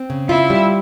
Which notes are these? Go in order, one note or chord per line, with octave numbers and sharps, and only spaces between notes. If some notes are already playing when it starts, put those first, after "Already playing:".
Already playing: C4
C#3
E4 F4
G3